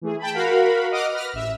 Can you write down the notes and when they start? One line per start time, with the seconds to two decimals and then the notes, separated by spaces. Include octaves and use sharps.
0.01 E3 A3 G#4
0.19 G5 A5 B5
0.33 F#4 A#4 F5 F#5 B5
0.91 D#5 F#5 D6 D#6 F6
1.13 B4 F6 A#6
1.33 A1 E5